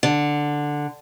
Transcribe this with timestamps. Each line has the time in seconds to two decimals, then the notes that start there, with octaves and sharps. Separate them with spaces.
0.03 D3